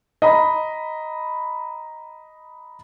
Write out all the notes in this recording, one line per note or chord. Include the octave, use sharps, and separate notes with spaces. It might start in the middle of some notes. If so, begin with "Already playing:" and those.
D#5 A#5 B5